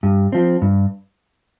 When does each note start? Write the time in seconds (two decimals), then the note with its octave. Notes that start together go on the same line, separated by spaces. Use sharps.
0.03 G2
0.32 F3 C4
0.62 G2